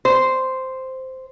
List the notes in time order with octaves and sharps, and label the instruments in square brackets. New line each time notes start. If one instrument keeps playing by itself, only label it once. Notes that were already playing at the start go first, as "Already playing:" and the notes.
[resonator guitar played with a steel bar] C5